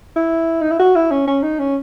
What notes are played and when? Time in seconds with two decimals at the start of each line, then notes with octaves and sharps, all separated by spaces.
0.16 E4
0.61 D#4
0.71 E4
0.79 F#4
0.96 E4
1.11 C#4
1.27 C#4
1.43 D#4
1.59 C#4